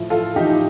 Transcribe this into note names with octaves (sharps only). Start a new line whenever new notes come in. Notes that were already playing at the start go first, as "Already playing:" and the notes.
Already playing: A2 F3
F4 A4
A2 F3 D#4 G4